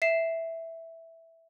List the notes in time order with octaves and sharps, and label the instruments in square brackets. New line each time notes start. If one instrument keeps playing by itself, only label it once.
[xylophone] E5 C7 E7